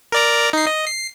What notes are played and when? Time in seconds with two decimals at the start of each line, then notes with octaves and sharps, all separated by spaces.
0.12 A#4 D5 A#5
0.53 D#4 C7
0.67 D#5
0.87 C7